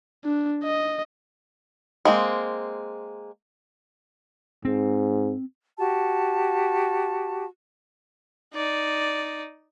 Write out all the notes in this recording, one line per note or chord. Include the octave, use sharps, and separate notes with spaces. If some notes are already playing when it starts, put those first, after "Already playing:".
D4
D#5
G#3 A#3 C4
G#2 C4
F#4 G4 A5
D#4 D5